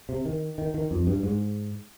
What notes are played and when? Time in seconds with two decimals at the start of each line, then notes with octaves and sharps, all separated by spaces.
0.09 C3
0.25 D#3
0.58 D#3
0.74 D#3
0.91 F2
1.07 G2
1.23 G#2